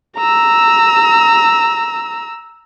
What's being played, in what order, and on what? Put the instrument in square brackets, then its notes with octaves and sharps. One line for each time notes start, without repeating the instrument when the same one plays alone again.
[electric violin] A#5 E6